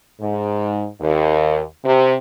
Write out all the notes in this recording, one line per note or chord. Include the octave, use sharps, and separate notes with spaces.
G#2
D#2
C3